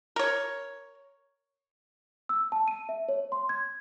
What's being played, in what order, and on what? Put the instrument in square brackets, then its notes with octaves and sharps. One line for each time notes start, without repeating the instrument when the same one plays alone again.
[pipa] A#4 C#5
[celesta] E6
A5
D#7
E5
C#5
C6
G#6